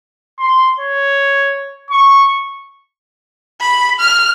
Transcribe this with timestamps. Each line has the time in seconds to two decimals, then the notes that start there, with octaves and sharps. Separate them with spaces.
0.40 C6
0.80 C#5
1.91 C#6
3.60 B5
4.00 F6